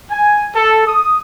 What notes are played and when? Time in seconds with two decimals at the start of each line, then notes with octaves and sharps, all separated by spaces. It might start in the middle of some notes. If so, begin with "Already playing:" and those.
0.10 G#5
0.55 A4
0.86 D#6